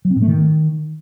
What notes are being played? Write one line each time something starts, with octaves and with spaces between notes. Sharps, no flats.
F#3
C4
A2
A3
D#3